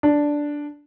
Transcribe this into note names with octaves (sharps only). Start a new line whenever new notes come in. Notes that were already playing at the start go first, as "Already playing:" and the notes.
D4